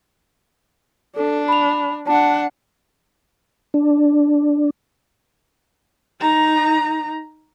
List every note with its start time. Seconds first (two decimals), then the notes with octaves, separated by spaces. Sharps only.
1.16 D4 A4
1.48 B5 F7
2.07 D4 F#5 A5
3.74 D4
6.21 D#4 A#5